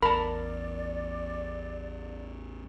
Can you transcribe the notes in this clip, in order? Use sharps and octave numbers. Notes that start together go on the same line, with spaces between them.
A1 E2 A#4 D5 A5 B5